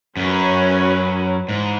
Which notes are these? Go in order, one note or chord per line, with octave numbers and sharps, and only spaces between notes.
F#2 C#4 F#4 B4
G#2 E3